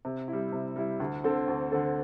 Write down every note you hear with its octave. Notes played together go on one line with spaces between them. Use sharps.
C3
G3 E4
C3
G3 E4
D2
D3 C4 A4
D2
D3 C4 A4